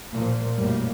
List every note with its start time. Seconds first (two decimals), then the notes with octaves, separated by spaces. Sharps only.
0.13 A#2 F3 A#3
0.57 B1 F#2 A2 G3 A#3